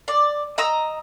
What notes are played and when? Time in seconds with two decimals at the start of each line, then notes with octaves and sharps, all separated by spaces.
0.08 D5
0.58 D#5 A#5 E6